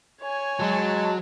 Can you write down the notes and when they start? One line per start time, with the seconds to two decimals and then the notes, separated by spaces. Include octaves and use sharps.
0.21 C#5 G#5
0.60 F#3 G#3 F#4 A5